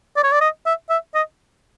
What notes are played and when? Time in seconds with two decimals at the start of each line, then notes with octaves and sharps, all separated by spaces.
0.17 D5
0.23 C#5
0.32 D5
0.41 D#5
0.66 E5
0.90 E5
1.14 D#5